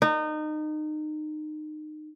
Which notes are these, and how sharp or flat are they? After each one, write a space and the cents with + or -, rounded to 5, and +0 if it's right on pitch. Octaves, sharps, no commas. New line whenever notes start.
D#4 -25